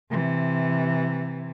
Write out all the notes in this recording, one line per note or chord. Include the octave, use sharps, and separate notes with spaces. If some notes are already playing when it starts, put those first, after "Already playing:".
C3 E3